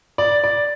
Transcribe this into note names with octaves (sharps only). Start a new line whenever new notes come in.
D5
D5